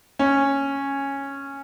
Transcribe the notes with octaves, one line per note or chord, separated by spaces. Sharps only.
C#4